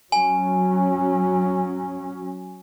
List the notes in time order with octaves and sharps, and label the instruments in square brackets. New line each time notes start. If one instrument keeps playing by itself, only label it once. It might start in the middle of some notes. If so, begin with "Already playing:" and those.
[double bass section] F#3 C#4 [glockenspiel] G#5